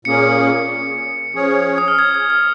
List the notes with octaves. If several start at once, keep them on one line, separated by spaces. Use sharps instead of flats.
A#2 A#3 C#4 G#4 C#7
F3 C#4 G#4 C#5
D#6
F6
G#6
G#6
F6